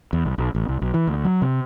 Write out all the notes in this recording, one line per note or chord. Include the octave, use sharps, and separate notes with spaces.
E2
C2
B1
A1
C2
B1
E3
D2
F#3
C3